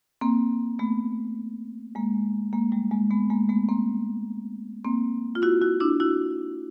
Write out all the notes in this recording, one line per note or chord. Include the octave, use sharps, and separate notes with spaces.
A#3 C4
A3 B3
G#3 A#3
G#3 A#3
G3 A3
G#3 A#3
A3 B3
G#3 A#3
A3 B3
A#3 C4
A#3 C4
F4
E4 F#4
E4 F#4
D4 E4
E4 F#4